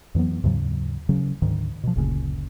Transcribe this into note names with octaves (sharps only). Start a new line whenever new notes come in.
F2 E3 F#3 B3
D#2 G#2 C#3 F#3
C#3 F#3 C#4
D2 G#2 D#3
B2 F3
F#1 D2 A#2 C#3